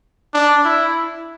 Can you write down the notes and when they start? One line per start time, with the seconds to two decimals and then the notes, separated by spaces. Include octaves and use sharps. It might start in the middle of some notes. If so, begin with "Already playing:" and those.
0.34 D4
0.64 E4